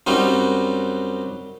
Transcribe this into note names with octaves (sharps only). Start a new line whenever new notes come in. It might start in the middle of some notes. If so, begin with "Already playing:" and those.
F#2 F#3 G3 C4 D#4